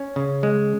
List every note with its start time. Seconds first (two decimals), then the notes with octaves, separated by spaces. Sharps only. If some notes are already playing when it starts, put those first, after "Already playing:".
Already playing: C#4
0.16 C#3
0.43 G#3